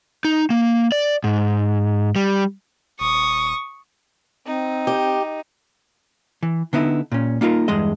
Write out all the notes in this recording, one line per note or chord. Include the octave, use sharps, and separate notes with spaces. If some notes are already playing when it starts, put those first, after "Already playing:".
D#4
A#3
D5
G#2
G3
D#1 C#6 D#6
C4 D#4
G4
E3
D3 B3 D#4 E4
A#2 C#4
A#3 D#4 F4 G4 A#4
E2 G2 G#3 D#5